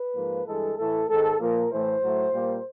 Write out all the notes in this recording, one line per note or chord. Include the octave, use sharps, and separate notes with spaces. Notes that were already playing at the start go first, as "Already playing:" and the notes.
Already playing: B4
G#2 F3 A#3
G2 E3 G#3 A4
A2 E3 A3 A4
G#2 D#3 G#3 A4
A#2 F3 A#3 A#4
A2 E3 A3 C5
A2 F#3 A3
A#2 G3 A#3